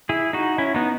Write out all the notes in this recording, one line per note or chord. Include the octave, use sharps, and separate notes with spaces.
E4 G#4
D#4 F#4
C#4 E4
B3 D#4